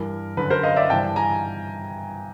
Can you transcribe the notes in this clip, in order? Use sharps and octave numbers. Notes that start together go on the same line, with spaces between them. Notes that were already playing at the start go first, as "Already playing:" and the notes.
Already playing: G2 E3 A#4
F#2 D3 B4
A#4 C5
D#5 F5
D5 E5
G2 E3 G5 A5
G#5 A#5